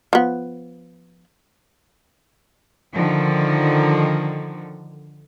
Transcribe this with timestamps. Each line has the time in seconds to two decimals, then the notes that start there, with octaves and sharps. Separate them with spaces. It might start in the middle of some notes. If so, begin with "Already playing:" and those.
0.13 F3 B3
2.93 D3 D#3 F3